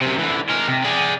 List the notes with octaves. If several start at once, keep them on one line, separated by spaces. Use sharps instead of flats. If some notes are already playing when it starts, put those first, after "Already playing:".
F#2 C3
D3 E3
G#3 A#4
C3
G#4 D5